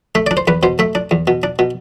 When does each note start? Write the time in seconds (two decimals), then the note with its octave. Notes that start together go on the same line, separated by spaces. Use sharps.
0.15 A3 E5
0.26 D4 D5
0.37 C5
0.47 E2 B4
0.63 B2 C5
0.79 A3 E5
0.95 D4
1.11 E2
1.27 B2
1.43 D4
1.59 B2